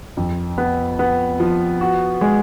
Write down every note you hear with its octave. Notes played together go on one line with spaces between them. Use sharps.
F2
B3
B3
F3
F#4
G#3